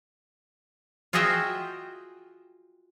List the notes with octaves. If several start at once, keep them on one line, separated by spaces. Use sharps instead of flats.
F4 F#4 G#4 D#5 E5 G5